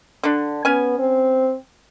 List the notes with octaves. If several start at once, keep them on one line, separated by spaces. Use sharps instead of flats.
D3 D4
B3 C#4 G#5
C4